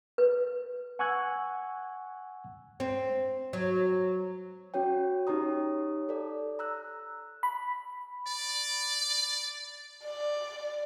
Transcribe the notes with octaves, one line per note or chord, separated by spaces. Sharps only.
B4
F#5 G#5 C#6 E6 F#6 G#6
C4
F#3
C#4 F#4 C#5 G5
D#4 G4 C#5 A#5 D#6
A4 D5
A#5 E6 F#6
B5
D5
D5